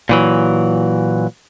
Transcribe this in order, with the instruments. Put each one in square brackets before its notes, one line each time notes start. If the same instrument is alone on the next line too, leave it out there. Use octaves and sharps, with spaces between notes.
[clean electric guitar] A#2 E3 F#3